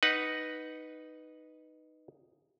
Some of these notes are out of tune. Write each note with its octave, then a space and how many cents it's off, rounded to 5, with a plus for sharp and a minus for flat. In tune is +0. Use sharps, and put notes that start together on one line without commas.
D#4 +0 B4 +0 F#5 +0